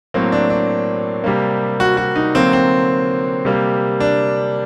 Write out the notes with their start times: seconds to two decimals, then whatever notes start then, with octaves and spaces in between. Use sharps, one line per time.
0.14 A2 F#3 A#3 C4
0.32 D4
0.50 D4
1.24 C3 G3 A#3
1.80 F#4
1.97 F#4
2.16 D#4
2.34 D3 F#3 A#3 C4
2.53 C4
3.45 C3 G3 A#3
4.00 D4